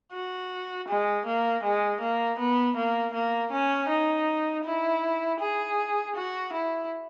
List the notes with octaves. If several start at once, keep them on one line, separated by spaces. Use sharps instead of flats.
F#4
G#3
A#3
G#3
A#3
B3
A#3
A#3
C#4
D#4
E4
G#4
F#4
E4